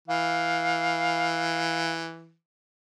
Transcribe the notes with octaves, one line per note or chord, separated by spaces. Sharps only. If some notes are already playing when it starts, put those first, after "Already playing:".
E3 F5